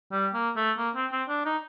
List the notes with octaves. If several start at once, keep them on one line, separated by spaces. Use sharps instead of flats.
G3
A#3
A3
A#3
C4
C4
D4
D#4